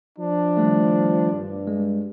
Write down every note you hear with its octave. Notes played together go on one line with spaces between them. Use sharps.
F3 D4
D#3 G3 A3
G2
G#3